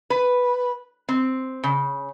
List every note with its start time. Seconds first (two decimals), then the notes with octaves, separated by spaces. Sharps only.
0.10 B4
1.09 C4
1.64 C#3